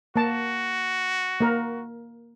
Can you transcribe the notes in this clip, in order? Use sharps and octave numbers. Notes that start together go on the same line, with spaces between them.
A#3 F#4 A5
A#3 A#4